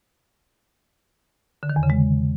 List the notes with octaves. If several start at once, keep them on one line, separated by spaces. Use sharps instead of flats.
D3
D#3
E2
C#3
G#3